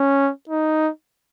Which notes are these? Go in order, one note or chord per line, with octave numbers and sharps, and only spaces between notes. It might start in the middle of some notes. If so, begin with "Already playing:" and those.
Already playing: C#4
D#4